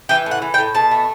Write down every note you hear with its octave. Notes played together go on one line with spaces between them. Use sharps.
E3 G4
A2
F#5
E3
G5
A2
B2 A5
A3